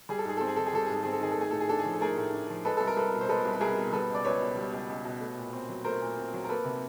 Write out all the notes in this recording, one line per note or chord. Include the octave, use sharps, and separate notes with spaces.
G3 G#4
A4
G#2 G#4
C4 A4
G#4
D#3 A4
G#4
G3 A4
G#4
G#2 A4
C4 G#4
A4
D#3 G#4
A4
A3 G#4
A2 A4
G#4
D4 A4
G#4
F3
A4
A3 G#4 A#4
A2
D4
F3
G#3 A4 B4
C2 A4
A#4
C2 A4 B4
B2
C5
G#3 A4 B4
C2
B4
C2 G#4 A#4
B2
G3 A4 B4
C#2
D5
C#2 B4 C#5
B2
G3
C#2
C#2
B2
A3
A#2
C4
F#3
A3 A#4 C5
A#2
C4
F#3
A#4
A#3 A4 B4
C3